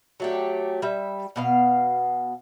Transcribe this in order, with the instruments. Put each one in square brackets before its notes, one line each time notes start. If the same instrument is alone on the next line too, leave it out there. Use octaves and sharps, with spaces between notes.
[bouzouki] F#3 A3 G4
G3 E5
B2 B3 F5